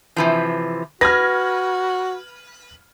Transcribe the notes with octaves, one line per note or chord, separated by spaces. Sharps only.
C3 E3 F3
F#4 B4 F6 G#6 A#6